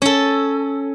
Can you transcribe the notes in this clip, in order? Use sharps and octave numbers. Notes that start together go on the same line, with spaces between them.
C#4 A4